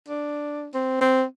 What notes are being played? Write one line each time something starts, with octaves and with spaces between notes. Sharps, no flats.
D4
C4
C4